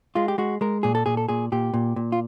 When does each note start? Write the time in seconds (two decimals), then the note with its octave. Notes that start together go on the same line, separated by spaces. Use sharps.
0.15 G#3 F4
0.28 G4
0.38 G#3 F#4
0.61 G#3 A#4
0.83 A#2 G#4
0.95 A4
1.06 A#2 G#4
1.17 A4
1.29 A#2 G#4
1.52 A#2 G4
1.74 A#2
1.96 A#2
2.12 F4